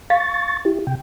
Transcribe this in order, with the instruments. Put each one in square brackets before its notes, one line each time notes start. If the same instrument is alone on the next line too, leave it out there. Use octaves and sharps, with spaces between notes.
[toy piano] F5 [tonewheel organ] C#6 A6
[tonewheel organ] E4 G4
C3 G5